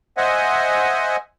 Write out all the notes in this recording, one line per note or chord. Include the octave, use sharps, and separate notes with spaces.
C5 D#5 E5 F#5 G#5